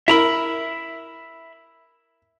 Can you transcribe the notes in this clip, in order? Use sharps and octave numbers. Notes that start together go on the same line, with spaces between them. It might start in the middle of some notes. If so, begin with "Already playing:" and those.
E4 A#4 E5 A#5 B5